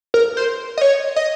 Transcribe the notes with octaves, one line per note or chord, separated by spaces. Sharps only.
A#4
C5
D#5
C#5
D#5